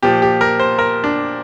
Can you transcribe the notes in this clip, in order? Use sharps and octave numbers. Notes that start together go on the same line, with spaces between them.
A#2 F3 G4
G4
A#4
C5
A#4
D4